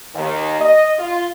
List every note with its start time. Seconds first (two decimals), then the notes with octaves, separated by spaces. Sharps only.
0.15 D#2
0.61 D#5
0.99 F4